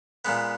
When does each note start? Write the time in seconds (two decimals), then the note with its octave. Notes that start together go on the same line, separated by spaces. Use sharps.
0.25 A#2 G#3 B3